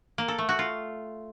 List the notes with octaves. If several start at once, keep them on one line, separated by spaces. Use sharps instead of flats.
A#3
A4
A3
F#4
F4